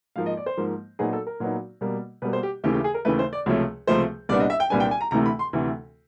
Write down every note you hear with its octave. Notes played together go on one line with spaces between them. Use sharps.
G#2 F3 A#3 F5
D#5
D5
C5
G#2 F3 A#3
A#2 F#3 B3 D#4 G#4
A4
A#4
A#2 F#3 B3 D#4
B2 G3 A#3
B2 G3 A#3 B4
C5
G4
D#2 C#3 E3 A3 G4
G4
G#4
A#4
D#2 C#3 E3 A3 B4
C5
D5
C#2 C3 F3 A3 C#5
C#2 C3 F3 A3 C5
C2 A#2 G3 B3 D4 D5
D#5
E5
G5
C2 A#2 G3 B3 D4 G#5
G5
G#5
A#5
D2 C3 E3 A3 A#5
B5
C6
D2 C3 E3 A3